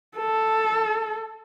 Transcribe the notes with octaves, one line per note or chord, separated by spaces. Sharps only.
A4